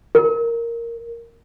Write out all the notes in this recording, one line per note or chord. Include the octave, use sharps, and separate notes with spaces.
A#4